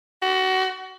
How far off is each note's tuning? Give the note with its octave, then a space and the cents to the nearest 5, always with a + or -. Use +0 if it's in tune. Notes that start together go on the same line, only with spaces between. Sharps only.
F#4 +25